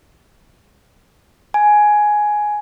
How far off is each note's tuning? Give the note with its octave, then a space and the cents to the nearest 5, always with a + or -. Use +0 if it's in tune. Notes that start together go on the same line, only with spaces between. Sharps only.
G#5 +10